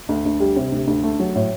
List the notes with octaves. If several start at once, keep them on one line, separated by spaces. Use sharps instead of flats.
D2
D2
G3
C3
D2
D2
A3
F#3
A2